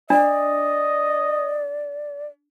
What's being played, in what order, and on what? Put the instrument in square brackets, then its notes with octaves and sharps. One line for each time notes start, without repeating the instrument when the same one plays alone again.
[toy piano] D4 [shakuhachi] D5 [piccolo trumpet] D#5